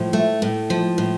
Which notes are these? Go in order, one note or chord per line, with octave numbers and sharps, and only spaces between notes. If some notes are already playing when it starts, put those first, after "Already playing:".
Already playing: A2 F3
A3
A2
F3
A2